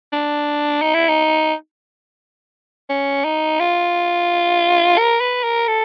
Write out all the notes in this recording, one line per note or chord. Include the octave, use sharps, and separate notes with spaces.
D4
D#4
E4
D#4
C#4
D#4
F4
A#4
B4
A#4
A4